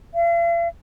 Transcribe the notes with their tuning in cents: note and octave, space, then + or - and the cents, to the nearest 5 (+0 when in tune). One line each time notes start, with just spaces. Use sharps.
F5 -45